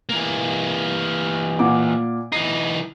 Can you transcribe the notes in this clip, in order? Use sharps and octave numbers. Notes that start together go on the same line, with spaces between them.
E3 A#3
A#2 F#5 D6
E3 D#4 C7